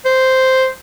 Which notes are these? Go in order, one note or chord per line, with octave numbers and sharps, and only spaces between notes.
C5